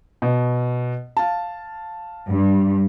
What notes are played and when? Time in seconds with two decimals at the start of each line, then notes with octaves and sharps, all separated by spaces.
0.22 B2
1.17 F5 A5
2.29 G2